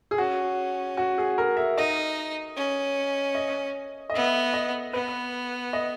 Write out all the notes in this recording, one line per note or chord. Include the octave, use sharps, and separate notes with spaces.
G#4
C#4 F#4
F#4
G#4
A#4
E5
D#4 D#5
C#4
D#5
D#5
B3 E5
D#5
B3 B4
D#5